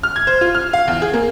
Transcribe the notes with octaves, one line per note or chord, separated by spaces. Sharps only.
F6
G#6
C5
F4
F6
F5
E2
G#4
A#3